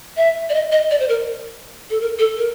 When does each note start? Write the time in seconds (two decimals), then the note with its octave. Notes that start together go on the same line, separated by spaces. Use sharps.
0.17 E5
0.50 D5
0.54 D#5
0.72 D#5
0.91 D5
1.00 C5
1.09 A#4
1.90 A4
2.01 A#4
2.19 A4
2.38 A#4